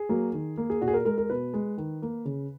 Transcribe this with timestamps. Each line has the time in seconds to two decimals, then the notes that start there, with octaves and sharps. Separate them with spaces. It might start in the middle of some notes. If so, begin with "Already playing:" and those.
Already playing: G#4
0.09 F#3 A#3
0.33 D#3
0.57 A#3
0.70 G#4
0.81 A#2 F#4
0.88 G#4
0.94 A#4
1.05 G#3 A#4
1.18 A#4
1.30 B2 B4
1.54 G#3
1.78 D#3
2.02 A#3
2.25 C#3